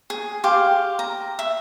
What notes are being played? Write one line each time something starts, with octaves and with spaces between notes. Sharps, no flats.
G#4
G4 F5 C6
A#5
E5